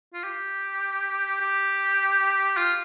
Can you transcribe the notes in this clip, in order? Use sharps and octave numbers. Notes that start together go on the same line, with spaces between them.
F4
G4
G4
F4